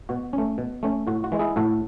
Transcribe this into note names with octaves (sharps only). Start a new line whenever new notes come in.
B2 F#4
C#4
A3
B2
A3 C#4
A2 F#4
F#4
E3 G#3
E4 G#4
A2 F#4 A4